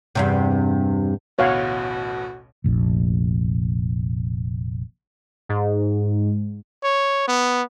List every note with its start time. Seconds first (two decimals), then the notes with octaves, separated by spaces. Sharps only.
0.15 E2 G2 C3
1.39 A1 D2 B2 F#4 C#5 F5 F#5
2.64 F1 A#1
5.49 G#2
6.83 C#5
7.28 B3